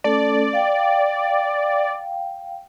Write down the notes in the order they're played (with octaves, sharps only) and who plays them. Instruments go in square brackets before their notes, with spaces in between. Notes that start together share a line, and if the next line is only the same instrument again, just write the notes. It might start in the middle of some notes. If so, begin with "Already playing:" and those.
[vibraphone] A3 C#4 A4 [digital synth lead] D5
[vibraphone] F5 G5